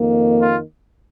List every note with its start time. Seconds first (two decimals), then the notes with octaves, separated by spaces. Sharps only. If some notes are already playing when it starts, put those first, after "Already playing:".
Already playing: F2 D#3 A#3
0.41 F4